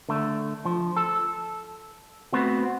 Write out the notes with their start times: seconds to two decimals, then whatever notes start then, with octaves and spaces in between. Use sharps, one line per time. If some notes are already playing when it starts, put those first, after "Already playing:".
0.09 D3 A3
0.65 F3
0.97 A4
2.33 A3 B3 C4 F#4